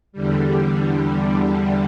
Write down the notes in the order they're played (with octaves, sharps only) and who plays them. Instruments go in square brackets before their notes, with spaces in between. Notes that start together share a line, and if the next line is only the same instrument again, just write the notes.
[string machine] E2 D3 G3